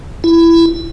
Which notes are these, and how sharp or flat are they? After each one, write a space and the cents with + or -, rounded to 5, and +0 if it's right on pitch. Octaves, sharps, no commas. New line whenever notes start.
E4 +15